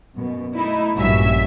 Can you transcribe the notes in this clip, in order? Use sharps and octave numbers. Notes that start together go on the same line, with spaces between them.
F#2 B2
A3 D#4 E4
A#1 G2 F#3 C#4 E5